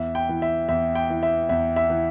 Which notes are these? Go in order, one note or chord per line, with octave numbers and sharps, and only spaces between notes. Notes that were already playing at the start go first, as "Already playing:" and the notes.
Already playing: E2 E5
G5
E3
E5
E2 E5
G5
E3
E5
E2 E5
E5
E3